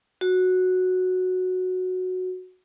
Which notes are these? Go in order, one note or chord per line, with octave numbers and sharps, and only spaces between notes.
F#4